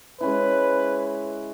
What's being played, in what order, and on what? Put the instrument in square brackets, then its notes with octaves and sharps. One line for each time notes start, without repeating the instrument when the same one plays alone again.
[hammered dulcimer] G#3 C#4 E4 [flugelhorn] B4